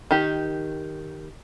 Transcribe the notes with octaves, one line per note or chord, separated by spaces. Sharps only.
D#3 G4